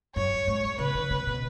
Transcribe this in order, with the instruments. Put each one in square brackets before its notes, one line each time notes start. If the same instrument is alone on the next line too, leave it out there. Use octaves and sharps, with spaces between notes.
[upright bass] F#2 [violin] C#5
[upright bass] G#2
[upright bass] C#3 [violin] B4
[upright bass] D#3
C#3
B2